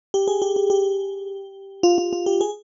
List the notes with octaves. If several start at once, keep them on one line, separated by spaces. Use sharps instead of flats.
G4
G#4
G4
G4
G4
F4
F4
F4
G4
G#4